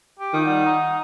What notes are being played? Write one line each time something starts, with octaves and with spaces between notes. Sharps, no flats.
G4
D#3 F4
G3 F#5
D#4